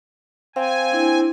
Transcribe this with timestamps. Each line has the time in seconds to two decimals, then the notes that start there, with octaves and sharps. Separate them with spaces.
0.56 C4 F5 G#5
0.92 D4 E4